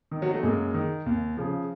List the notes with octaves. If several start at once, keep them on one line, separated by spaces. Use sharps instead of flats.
D#3
F#3
A3
F#2 G#3 A#3
D#3
D#2
C#3 F3